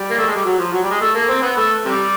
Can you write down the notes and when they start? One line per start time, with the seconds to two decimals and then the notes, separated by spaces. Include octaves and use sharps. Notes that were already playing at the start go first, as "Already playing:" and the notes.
Already playing: G3
0.11 A#3
0.18 A3
0.27 G#3
0.36 G3
0.45 F#3
0.58 F3
0.73 F#3
0.83 G3
0.91 G#3
1.01 A3
1.15 A#3
1.29 C4
1.42 B3
1.57 A3
1.85 C3 G3